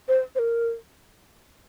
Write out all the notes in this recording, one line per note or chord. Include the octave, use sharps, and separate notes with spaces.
C5
C5
A#4